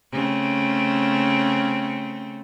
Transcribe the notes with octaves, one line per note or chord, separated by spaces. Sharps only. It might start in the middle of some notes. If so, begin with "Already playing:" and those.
C#3 A3 C4